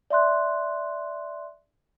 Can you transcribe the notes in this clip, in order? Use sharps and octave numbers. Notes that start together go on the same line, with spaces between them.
D5 E5 C6 F#6